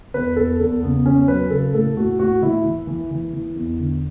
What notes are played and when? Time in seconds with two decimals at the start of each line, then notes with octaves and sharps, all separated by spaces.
0.14 E2 B4
0.36 E2 A4
0.59 E2 A4
0.83 C#3 B3
1.05 E2 C#4
1.28 F#3 B4
1.50 C#3 A4
1.74 A2 A4
1.97 A2 F#4
2.19 A2 F#4
2.42 E3 E4
2.64 E3
2.87 E3
3.11 E3
3.33 E3
3.56 E2
3.79 D3